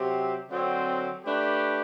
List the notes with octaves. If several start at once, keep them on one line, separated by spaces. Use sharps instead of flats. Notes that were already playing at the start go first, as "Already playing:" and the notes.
Already playing: C3 F#3 C4 G4
D3 F#3 C4
A3 D4 G4 B4